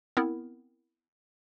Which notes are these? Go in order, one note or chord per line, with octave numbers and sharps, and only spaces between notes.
B3 C4 E4 A#4